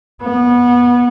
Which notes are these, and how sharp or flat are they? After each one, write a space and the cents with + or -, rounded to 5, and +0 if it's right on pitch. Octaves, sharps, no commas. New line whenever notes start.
B3 -20